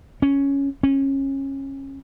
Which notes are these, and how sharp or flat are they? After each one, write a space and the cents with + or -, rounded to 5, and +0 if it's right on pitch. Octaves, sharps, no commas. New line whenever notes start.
C#4 +5
C#4 -25